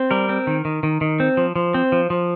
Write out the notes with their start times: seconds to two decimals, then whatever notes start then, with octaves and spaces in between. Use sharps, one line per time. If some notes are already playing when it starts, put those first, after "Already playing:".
Already playing: C4
0.11 G3 A#4
0.29 C4
0.47 D#3
0.65 D#3
0.83 D#3
1.01 D#3
1.20 C4
1.37 F3
1.56 F3
1.74 C4
1.92 F3
2.10 F3